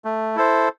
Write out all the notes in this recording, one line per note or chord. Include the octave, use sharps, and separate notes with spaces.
A3
E4 A4 C5